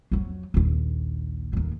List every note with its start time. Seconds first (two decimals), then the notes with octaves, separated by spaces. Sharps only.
0.11 F2 F#3
0.54 A#1 D#2
1.53 D#2 A2